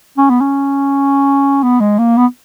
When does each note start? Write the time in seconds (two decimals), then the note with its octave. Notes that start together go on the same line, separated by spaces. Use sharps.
0.17 C#4
0.29 B3
0.41 C#4
1.63 B3
1.80 G#3
1.99 A#3
2.17 B3